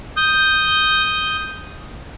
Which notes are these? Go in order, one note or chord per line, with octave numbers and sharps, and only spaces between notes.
D#6 G6